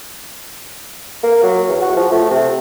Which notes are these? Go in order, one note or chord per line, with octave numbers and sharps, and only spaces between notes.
A#3
F#3
E2
F#4
F3
A3
C3